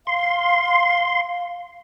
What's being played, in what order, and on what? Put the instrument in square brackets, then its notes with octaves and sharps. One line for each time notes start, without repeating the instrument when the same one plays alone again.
[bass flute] F5 [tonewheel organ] C6